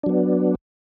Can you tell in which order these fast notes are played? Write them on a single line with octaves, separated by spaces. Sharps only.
D4 F#3 B3